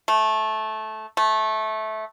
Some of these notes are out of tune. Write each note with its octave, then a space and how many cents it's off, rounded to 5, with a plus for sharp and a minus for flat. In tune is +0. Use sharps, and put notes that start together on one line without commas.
A3 -15
A3 -15